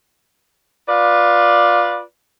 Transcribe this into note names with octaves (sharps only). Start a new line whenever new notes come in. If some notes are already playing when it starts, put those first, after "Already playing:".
F4 B4 D5